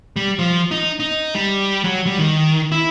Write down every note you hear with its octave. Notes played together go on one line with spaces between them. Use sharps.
G3
F3
D#4
D#4
G3
F#3
G3
D#3
E4